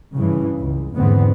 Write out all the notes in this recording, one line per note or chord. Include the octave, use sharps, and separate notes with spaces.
G2 C#3 E3
C#2
E2 G#2 D3 B3 C4